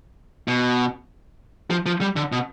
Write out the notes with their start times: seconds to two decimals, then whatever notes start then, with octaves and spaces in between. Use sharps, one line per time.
0.48 B2
1.71 F3
1.86 F3
2.01 G3
2.16 D3
2.32 B2